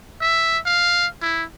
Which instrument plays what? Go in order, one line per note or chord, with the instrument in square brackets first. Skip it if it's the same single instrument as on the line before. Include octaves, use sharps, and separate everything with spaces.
[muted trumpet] E5
F5
E4